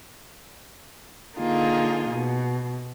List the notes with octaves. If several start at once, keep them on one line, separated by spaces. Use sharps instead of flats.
D3 A#3 D#4 F4 G#4
B2